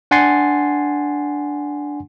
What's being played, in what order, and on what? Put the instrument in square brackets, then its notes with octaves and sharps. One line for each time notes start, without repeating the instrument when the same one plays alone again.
[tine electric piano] D4 F#5 G#5 C6 A6 C7